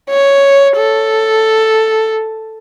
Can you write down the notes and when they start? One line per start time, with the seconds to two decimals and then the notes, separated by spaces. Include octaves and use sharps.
0.10 C#5
0.77 A4